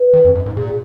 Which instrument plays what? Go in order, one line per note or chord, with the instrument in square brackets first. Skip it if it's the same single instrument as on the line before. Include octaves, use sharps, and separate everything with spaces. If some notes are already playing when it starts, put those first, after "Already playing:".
Already playing: [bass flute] B4
[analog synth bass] D#3
F2
F#2
G#2
[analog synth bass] A#2 [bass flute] G#4
[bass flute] G#4